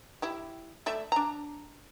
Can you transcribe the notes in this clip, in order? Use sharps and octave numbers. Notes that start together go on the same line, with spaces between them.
E4 G4
A3 D5 E5
D4 A#5